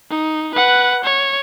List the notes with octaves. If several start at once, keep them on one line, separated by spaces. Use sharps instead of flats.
D#4
B4 F#5
C#5